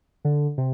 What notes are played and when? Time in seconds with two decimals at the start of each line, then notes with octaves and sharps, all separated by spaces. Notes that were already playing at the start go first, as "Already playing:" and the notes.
0.25 D3
0.58 C3